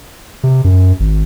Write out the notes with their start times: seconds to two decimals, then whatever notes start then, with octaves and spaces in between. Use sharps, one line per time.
0.43 C3
0.64 F#2
1.00 G#1